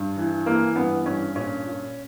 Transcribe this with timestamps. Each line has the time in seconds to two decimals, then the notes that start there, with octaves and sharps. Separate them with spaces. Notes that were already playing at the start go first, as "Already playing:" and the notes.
Already playing: G2
0.17 E3
0.46 E3 A#3
0.76 G2 B3
1.06 G2 C#4
1.35 A#2 C#4
1.65 A#2